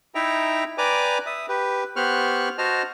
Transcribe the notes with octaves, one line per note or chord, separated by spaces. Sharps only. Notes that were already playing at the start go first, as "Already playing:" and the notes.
D#4 E4 E5 G5 A#5
B4 D5 G5 G#5 A#5 D6
E5 D#6
G4 B4
B3 G4 C5 C#6 F6 F#6
F#4 C5 D#5 A5 F6